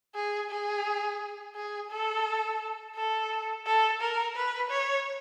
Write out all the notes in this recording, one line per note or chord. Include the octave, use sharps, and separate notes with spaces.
G#4
G#4
G#4
A4
A4
A4
A#4
B4
C#5